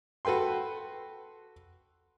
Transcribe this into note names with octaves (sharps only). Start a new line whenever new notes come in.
F#4 A4 B4 G5 C6